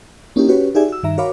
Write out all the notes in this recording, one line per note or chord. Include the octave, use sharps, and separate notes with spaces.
A#3 C#4 D#4 E4 G4
C#4 F#4 G4 B4 C#5
D#4 G4 G#4 D5 E5 G#5
F#4 E6
G2 D#3 E5 A#5
F#4 A#4 C#5 F5 B5 D6